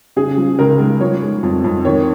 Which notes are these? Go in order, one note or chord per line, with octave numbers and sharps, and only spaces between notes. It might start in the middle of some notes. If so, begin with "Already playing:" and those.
C#3 G#4
F3
C#2 A#4
G#3
F3 C#5
G#3
F2
F2
D#3 C#5